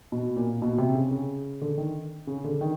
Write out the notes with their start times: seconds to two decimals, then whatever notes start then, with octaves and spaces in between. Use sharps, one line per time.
0.12 B2
0.36 A#2
0.62 B2
0.78 C3
0.95 C#3
1.11 C#3
1.61 D3
1.78 D#3
2.27 C#3
2.44 D3
2.61 D#3